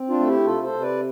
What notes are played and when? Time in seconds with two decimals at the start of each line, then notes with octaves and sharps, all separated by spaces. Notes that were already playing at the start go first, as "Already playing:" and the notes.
Already playing: C4
0.09 D4 F4
0.19 A3 A4
0.27 E4 G4
0.45 C3 F4 A4
0.63 A4 C5
0.72 C3
0.81 B4 D5